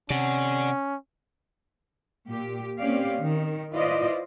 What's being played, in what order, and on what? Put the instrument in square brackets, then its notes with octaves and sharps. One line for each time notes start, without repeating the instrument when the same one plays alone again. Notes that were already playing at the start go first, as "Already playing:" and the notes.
[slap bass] C3 [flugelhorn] C#4 [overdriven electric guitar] D5 F#5
[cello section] A#2 G4
A#3 C4 C#4 G4 D5 F5
D#3
E4 F4 B4 C5 D5 D#5